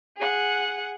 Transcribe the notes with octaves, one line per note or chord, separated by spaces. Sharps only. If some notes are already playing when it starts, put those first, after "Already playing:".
G#4 F#5